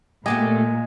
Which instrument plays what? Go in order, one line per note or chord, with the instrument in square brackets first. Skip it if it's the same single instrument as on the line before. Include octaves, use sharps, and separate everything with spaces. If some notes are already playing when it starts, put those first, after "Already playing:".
[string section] A#2 [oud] A3 B3 G4 [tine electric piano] D#5 G#5